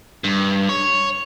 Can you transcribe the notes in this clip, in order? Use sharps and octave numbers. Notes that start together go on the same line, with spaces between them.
G2
C#5